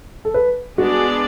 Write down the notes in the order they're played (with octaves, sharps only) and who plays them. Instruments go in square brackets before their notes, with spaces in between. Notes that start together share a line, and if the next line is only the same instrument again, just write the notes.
[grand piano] A4
B4
[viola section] G#3 B3 D4 G#4 D5 [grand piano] F#4